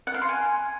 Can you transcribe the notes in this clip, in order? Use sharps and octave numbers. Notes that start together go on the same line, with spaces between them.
F#5
F5
C6
G#5